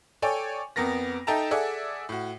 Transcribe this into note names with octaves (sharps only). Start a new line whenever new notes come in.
A4 C#5 D5 G5 G#5
F2 B3 A#4 A#6
D#4 A4 E5 G5 A5 A#5
G#4 A4 D5 E5 F#5
A2 F#4